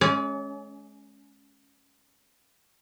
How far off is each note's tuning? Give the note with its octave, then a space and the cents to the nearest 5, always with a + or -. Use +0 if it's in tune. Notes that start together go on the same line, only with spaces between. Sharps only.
G#3 +30 C#4 +0 D5 -40